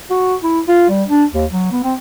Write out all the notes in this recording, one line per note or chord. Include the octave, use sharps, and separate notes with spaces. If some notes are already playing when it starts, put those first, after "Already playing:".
F#4
E4
F4
G3
D4
D#2
F#3
B3
C4